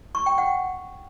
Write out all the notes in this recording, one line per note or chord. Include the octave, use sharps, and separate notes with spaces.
C#6
G5
F#5